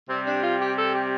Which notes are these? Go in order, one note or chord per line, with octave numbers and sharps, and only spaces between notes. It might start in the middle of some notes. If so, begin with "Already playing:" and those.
C3 G3 C4
D4
F4
G4
A4
G4